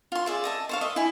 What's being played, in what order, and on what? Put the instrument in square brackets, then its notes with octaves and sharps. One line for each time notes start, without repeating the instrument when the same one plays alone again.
[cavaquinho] F4 C6
G#4 D5 E5
D#5 E5 A5
C5 C#5 F5
D#5 E5
E4 G#5